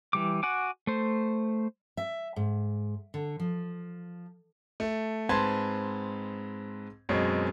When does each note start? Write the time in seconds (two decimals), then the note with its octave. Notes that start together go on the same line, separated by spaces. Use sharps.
0.13 E3 G3 D6
0.43 F#4 F#5 G#5 D6
0.87 A3 C5
1.97 E5
2.36 G#2
3.14 D3
3.40 F3
4.80 A3
5.29 G#2 C4 B4 A5 C6 G#6
7.09 F#2 B2 G#3 C4 C#5